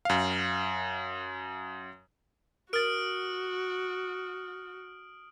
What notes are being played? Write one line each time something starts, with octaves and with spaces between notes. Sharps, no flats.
F#2 F5
F#4 A#4 D#6 F6 A6 D7